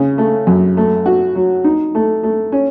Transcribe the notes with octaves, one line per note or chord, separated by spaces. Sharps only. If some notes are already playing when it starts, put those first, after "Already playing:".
Already playing: C#3
A3
F#2
A3
F#4
F#3
D#4
A3
A3
C#4